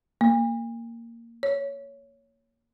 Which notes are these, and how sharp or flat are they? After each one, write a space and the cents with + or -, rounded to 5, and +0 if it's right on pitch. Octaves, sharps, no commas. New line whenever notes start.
A#3 -10
C#5 +10